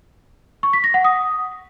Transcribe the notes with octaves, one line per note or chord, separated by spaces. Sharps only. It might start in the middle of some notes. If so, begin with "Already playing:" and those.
C#6
B6
A#6
F#5
D#6